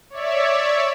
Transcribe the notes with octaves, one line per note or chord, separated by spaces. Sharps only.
C#5 D5 E5